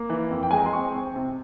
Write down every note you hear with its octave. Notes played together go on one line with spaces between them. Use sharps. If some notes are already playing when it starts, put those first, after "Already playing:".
Already playing: A#3
E3
F2
G5
G#3 G#5
A#5
C6
C4 C#6
C4
C3